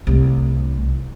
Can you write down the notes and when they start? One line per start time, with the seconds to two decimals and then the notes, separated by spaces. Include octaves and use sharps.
0.07 C2 A3